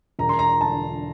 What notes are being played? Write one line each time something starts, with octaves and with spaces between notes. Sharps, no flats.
E1 A#5
C6
A#5
D3 A5